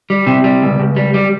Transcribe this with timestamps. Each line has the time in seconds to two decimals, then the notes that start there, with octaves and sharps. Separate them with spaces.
0.10 G3
0.27 C3
0.44 G3
0.62 C#2
0.79 C#2
0.96 G3
1.14 G3